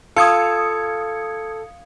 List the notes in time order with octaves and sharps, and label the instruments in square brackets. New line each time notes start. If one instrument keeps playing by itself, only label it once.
[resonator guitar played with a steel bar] F4 [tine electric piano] A4 [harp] F5 E7 [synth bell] D#6 G#6 C#7